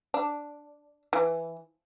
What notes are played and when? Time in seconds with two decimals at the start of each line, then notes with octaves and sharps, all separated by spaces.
0.14 D4
1.13 E3